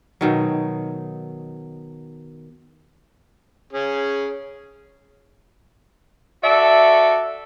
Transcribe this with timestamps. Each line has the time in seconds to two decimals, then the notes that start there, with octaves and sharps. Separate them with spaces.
0.21 B2 D#3 F#3
3.73 C#4 G#4
6.43 F#4 A4 D5 E5